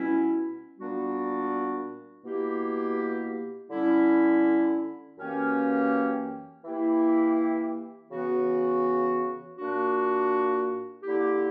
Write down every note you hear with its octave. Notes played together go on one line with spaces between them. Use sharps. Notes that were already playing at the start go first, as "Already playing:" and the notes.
Already playing: B2 G3 C#4 E4
A#2 G3 B3 D4 F#4
B2 A#3 E4 G4
D3 G3 C#4 E4
F#2 E3 A#3 C#4 G4
E3 A#3 E4 G4
C#3 E3 B3 F#4
A#2 A#3 D4 F#4
D3 A#3 E4 G4